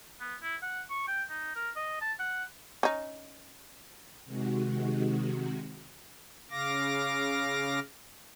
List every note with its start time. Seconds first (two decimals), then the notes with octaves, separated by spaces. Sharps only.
0.21 B3
0.43 E4
0.62 F#5
0.90 C#6
1.08 G5
1.29 D#4
1.55 A#4
1.76 D#5
2.01 A5
2.20 F#5
2.83 C#4 D#4
4.26 C3 D#3 G#3 F#4
6.50 C#3 F5 D6 A#6